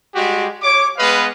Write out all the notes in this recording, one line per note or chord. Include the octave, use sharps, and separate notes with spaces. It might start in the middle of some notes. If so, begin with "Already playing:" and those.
G3 G#3 F#4 G4
C#5 D6
G#3 B3 B4 D#5 F5